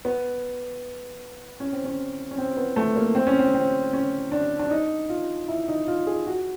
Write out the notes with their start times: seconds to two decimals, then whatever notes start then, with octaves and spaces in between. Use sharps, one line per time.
0.05 B3
1.60 C#4
1.73 C4
1.85 C#4
2.31 C#4
2.38 C4
2.57 B3
2.76 A3
2.96 A#3
3.15 C4
3.27 C#4
3.39 C4
3.54 C4
3.93 C#4
4.32 D4
4.59 D4
4.70 D#4
5.09 F4
5.48 E4
5.68 D#4
5.88 F4
6.07 G#4
6.26 F#4